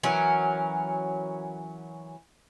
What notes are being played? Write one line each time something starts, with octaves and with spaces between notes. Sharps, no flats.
E3 F#3 C#4 A#4